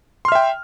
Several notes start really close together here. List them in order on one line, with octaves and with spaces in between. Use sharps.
C6 F6 E5 G5